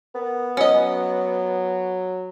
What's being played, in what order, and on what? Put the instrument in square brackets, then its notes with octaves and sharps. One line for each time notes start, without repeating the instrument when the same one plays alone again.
[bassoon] B3 [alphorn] A#4
[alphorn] F#3 [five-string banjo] C#4 D#5